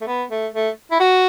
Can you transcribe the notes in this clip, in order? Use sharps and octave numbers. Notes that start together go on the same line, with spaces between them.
A3
B3
A3
A3
E4
F#4